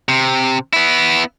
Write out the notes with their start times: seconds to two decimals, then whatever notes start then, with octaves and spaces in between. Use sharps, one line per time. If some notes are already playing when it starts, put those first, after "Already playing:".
0.09 C3
0.73 B3 E4